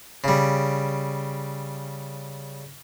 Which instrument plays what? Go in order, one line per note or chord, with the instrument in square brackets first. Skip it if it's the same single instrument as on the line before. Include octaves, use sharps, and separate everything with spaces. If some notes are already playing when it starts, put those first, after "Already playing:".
[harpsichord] C#3 G3